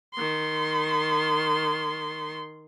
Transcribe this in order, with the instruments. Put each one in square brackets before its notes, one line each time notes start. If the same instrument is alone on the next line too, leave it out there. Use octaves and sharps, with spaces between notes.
[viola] D#3 C6